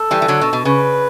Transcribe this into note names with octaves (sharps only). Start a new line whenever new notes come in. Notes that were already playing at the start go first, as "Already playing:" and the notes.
Already playing: A4
E3 G3
E3
D3 F#3
B2
B2
C#3 B4